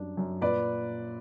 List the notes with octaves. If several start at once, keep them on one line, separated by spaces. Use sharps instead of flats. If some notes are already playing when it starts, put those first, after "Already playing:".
Already playing: F#2 G3 D4
F#2
A#2 B4 D5